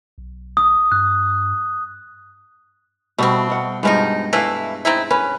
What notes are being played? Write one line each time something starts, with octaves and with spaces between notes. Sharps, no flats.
B1
D#6
G2 F#6
B2 G3 A3 C4 F#4
B2 F#5
G2 E3 F3 G#3 D#4 G5
E3 A3 E4 D5 F5
C4 D#4 E4
C#4 B4